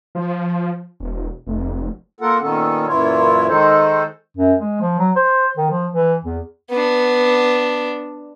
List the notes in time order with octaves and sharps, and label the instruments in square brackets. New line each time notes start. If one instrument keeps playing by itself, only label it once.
[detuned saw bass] F3
E1
F1
[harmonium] A#3 F4 A4 A#4 F#5
A#2 D#3 B3 C#4 A4
F#2 A#2 E3 E4 F4 C#5
D#3 G#3 D#4 A4 C5
[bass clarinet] F#2
G#3
F3
F#3
C5
D#3
F3
E3
E2
[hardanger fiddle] B3 D4